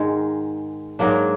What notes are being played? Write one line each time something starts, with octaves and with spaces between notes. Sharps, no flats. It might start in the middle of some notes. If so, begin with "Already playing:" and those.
Already playing: G#2 D#3 G#3
G#2 F#3 A#3 D4